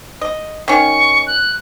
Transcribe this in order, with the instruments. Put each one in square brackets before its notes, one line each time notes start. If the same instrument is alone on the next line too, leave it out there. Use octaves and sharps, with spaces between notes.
[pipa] D#5
[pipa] D#3 C#4 [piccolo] C#6
[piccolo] F#6